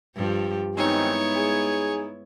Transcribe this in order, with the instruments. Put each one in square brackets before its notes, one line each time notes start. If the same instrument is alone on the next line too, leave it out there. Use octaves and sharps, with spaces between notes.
[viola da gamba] G2 F3 G4
[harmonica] D#3 C4 G#5 [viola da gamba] G#3 B3 E4 [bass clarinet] D#4 [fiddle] C#5
[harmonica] G#4